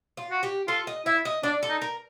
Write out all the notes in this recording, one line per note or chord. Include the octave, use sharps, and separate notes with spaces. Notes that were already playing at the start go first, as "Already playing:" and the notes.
F4
F#4
G4
F4 A4
D#5
E4 E5
D#5
D4 D5
A4
D#4
A#4